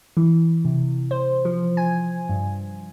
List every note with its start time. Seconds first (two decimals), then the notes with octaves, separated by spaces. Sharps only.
0.17 E3
0.65 C3
1.11 C5
1.45 F3
1.77 G#5
2.29 G2